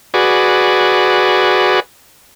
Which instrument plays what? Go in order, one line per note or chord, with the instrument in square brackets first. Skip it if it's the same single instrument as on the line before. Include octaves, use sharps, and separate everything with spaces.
[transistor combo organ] F#4 G#4 B4 D5